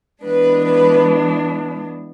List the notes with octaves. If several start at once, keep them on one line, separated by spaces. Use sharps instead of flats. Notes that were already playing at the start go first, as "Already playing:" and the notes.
E3 G#3 B3 D4 B4
B4